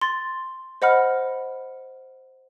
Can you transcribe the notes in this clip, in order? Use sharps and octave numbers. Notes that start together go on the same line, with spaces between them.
C6 A6
C5 D#5 F#5 B5 F6